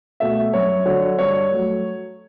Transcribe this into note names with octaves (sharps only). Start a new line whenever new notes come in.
B2 A3 E5
F#2 C#5
D3 F#3 C#5
G2 C#5
F#3 A3